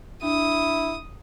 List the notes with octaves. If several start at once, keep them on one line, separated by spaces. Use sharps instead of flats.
D4 E4 D#6